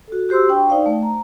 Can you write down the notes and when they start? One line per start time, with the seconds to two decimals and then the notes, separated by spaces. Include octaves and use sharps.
0.08 F#4 A4
0.29 F#4 G4 C5 C6 E6
0.49 D4 G5 C#6
0.70 D#4 C5 D5 F5
0.86 A3
1.03 A#5